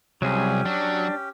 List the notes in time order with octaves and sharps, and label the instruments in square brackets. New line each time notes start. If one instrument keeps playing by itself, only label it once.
[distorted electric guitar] C2 [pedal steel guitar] F#3 G#4 [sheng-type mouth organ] C#4 G4
[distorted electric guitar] F#3 [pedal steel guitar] D4